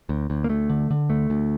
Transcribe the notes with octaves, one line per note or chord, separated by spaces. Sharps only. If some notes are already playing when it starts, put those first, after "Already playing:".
D2
D2
A#3
D2 A3
D3
D3
D2 A3
D2